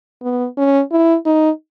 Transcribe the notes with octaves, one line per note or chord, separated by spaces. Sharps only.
B3
C#4
E4
D#4